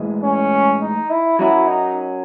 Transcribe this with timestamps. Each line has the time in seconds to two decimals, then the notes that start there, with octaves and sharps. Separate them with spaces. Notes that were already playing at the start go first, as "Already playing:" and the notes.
Already playing: A2 E3 G#3
0.23 C#4
0.81 D#4
1.10 E4
1.39 F#3 C#4 E4 F#4
1.67 D#4